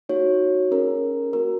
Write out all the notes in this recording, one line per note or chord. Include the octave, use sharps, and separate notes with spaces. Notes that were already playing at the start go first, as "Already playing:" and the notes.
A#3 D#4 F#4 C#5
C#4 G#4 A#4
A#3 F#4 A#4